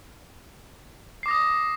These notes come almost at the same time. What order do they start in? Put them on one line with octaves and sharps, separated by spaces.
C7 D6 A#6 D#6